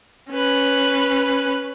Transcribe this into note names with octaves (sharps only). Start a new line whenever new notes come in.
C#4 B4